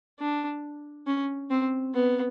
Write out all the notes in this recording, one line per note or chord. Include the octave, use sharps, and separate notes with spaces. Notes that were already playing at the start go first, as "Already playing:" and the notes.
D4
C#4
C4
B3